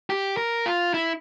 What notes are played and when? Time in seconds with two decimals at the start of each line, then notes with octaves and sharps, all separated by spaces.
0.10 G4
0.37 A#4
0.66 F4
0.94 E4